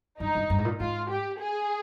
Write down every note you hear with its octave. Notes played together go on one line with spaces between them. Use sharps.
G2 D#4
G2
G2
G#2
A#2
G#2 F4
G4
G#4